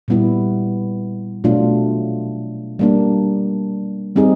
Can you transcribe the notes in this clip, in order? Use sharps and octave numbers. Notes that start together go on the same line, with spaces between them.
A#2 G3 B3 E4
B2 F#3 A3 D4 F4
G3 A#3 D4
G3 C4 D#4 G#4